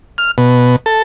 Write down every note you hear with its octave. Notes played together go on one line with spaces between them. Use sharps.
F6
B2
A4